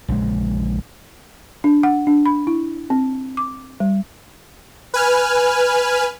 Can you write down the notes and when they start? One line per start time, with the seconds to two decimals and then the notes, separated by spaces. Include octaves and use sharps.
0.08 A#1 C#3 G#3
1.64 D4
1.83 F#5
2.07 D4
2.26 B5
2.47 E4
2.90 C4
3.37 D6
3.80 G3
4.94 B4 G#5 F6